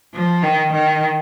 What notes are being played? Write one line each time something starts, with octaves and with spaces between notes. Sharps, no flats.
F3
D#3
D#3